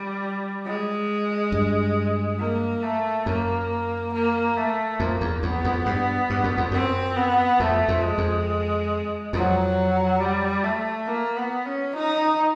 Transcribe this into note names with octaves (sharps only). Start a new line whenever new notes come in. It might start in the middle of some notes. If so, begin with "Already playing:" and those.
Already playing: G3
G#3
G2
A#3
A3
F#2 A#3
A#3
A3
F2 A#3
E2
E2 B3
F2
G2
G2
F#2
F2
F#2 C4
B3
F2 A3
F2
G#3
F2
F2 F#3
G3
A3
A#3
B3
C#4
D#4